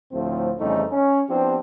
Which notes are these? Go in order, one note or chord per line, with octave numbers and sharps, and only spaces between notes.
D2 A2 F3 A3 C4
F2 C#3 E3 G3 A3 D#4
C#4
F3 B3 C4 D4 E4 G4